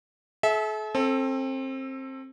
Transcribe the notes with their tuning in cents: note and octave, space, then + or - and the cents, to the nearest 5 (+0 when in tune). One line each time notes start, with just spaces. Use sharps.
A4 -45 E5 -20
C4 +25 A4 +0